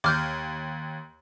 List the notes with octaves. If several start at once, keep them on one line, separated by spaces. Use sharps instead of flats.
D#2 D6 F6 G6